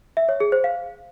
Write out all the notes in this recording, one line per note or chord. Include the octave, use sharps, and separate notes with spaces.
E5
C#5
G#4
C5
F5